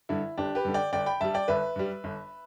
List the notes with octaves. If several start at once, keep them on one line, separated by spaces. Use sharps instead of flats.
G2 D3 E4
G1 D4 G4
G4 B4
G2 D3
D5 G5
G1 D5 G5
G5 B5
G2 G3 E5 A5
D5 G5
G1 B4 E5
G2 G3
G1